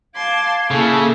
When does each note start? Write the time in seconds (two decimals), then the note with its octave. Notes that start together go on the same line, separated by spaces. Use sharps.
0.15 F5 A5 C6 D6 G#6
0.71 C#3 A#3 E4 A4 A5